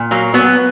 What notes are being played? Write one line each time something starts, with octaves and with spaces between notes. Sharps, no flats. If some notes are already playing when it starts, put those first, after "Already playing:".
Already playing: A#2
F#3 A#3
F#3 B3